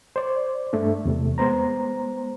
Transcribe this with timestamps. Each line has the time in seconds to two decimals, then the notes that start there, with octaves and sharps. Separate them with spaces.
0.16 C5 D5
0.73 G2 A3 D4
1.05 E2 C3 A3
1.38 G#3 B3 C5 A#5